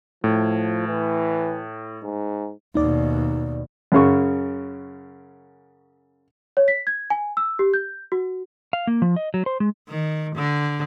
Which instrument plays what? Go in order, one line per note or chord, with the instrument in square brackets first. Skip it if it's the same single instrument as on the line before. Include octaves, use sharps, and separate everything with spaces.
[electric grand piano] A2 [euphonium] F3
[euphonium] E3
G#2
[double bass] D#2 B2 [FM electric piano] D#4 D5
[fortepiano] F#2 C#3 C#6
[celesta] C#5
B6
G#6
G#5
E6
G4
G6
F#4
[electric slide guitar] F5
A#3
F3
D#5
F#3
C5
G#3
[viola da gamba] D#3
D3